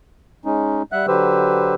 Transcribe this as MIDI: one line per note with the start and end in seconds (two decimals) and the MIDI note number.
0.45 0.83 56
0.45 0.83 61
0.45 0.83 63
0.92 1.06 55
0.92 1.06 76
0.92 1.06 78
0.92 1.06 90
1.07 1.75 50
1.07 1.75 54
1.07 1.75 67
1.07 1.75 71
1.07 1.75 72
1.07 1.75 88